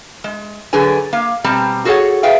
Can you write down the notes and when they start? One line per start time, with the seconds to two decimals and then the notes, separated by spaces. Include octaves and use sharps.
0.24 G#3
0.73 D3 F#3 G#4 B4 G#5
1.13 A#3 F5
1.44 B2 G3 C4 A5 A#5
1.85 F#4 G#4 A4 C5 C#5 F#5
2.23 G#4 B4 E5 F5 G5